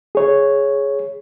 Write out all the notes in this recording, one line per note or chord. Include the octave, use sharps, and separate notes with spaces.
G#4 C#5